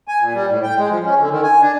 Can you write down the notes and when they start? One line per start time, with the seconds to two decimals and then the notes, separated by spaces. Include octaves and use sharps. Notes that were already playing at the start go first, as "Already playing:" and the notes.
0.08 G#5
0.21 A#2
0.34 G3
0.49 A2
0.63 G5
0.78 G#3
0.91 F3
1.04 C#4
1.19 D3
1.31 D#3
1.43 G#5
1.62 D4